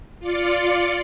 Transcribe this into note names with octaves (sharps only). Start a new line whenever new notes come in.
F4 D5 C#7